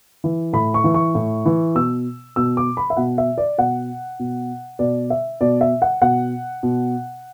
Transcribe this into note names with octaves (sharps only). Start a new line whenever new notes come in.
E3
A2 B5
C#6
E3
C#6
A2
E3
B2 E6
B2 E6
D6
B5
E5
B2 F#5
E5
D5
B2 F#5
B2
B2 D5
E5
B2 D5
E5
F#5
B2 F#5
B2